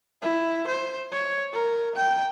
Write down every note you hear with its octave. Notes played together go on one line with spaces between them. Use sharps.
E4
C5
C#5
A#4
G5